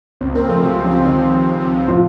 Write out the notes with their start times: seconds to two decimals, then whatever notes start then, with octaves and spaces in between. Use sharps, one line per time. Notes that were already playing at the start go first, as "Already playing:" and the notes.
0.21 C#2 C4 C5
0.35 A#3 C4 A#4
0.48 F3 A3 A4
0.63 C3 F#3 F#4
0.77 C#2
0.84 F3 F4
0.91 C4
1.04 D#3 F3 D#4
1.19 C3
1.33 C#2
1.46 C4
1.60 F3
1.75 C3
1.88 A2 F3 F4